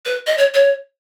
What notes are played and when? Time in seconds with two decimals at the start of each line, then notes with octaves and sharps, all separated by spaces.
0.05 B4
0.26 D#5
0.38 C#5
0.54 C#5